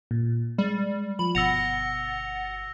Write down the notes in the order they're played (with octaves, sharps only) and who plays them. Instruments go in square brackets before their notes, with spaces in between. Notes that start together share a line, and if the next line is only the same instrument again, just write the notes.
[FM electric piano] A#2
[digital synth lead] G3 [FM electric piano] G#3
[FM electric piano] F3 [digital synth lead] B5
[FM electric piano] G1 B2 A6 [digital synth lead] F#5 [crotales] E6 A#6 F7